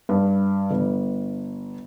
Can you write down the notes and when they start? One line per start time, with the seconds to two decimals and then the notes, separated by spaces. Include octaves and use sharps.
0.09 G2
0.71 G1